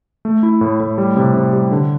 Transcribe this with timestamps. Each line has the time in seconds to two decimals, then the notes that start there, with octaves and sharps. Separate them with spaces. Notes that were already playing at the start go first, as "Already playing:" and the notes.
0.25 A3
0.43 E4
0.61 A2
0.80 A2
0.98 G3
1.17 C3
1.34 C3
1.53 G3
1.72 D3